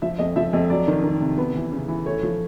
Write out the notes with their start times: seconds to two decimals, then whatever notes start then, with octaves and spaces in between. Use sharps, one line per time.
0.02 F3 E5
0.19 F2 D#5
0.36 F3 E5
0.53 F2 D#5
0.70 F#3 D5
0.88 D#3
1.04 D#3
1.21 C3
1.38 B3
1.55 E3
1.72 C#3
1.88 E3
2.06 A3 C#5
2.23 F3